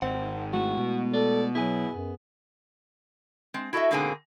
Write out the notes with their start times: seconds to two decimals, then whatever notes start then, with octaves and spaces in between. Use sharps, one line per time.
0.02 G#1 C4 F#5
0.53 G#3 A3 E4 F#4
0.77 B2
1.14 A4 D5
1.55 F#3 B3 E4 G#4 G#5
1.92 F#2
3.54 G#3 C4
3.73 E4 F#4 A4 C#5 D#5 E5
3.91 G#2 B2 D3 A#3 C4 G#4